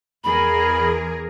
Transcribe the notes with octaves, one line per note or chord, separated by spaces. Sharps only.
E2 G#4 A#4 B5